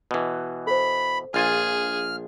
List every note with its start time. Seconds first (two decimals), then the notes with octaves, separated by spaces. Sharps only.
0.11 B2 E3
0.67 A4 C5 B5
1.34 A#1 F4 G#4 G#5 F6